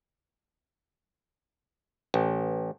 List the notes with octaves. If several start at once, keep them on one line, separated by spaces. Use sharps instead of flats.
A1